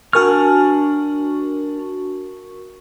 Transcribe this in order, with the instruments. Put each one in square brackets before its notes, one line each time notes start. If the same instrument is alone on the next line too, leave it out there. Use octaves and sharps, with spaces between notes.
[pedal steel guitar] D4 G#5 F6 [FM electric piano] F#4 A#4 C#6